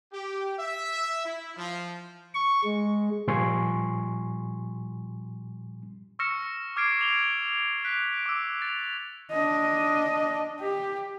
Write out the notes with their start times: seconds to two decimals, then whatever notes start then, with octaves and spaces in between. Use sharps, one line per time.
0.13 G4
0.59 E5
1.26 E4
1.57 F3
2.35 C#6
2.64 G#3
3.28 A#2 F3 G3 G#5 C6 C#6
6.19 C#6 E6 F6 A#6 C#7 E7
6.76 D6 F6 G#6 C7 D7
6.99 C7 F7 G7
7.85 F#6 B6 D7
8.26 D6 E6
8.62 A6 F7
9.31 D4 D#5
10.60 G4